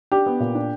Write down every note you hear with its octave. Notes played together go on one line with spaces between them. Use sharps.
D4 G4
B3
A#2
D4